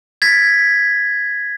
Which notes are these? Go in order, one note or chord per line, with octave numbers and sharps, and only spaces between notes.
G#6 A6 B6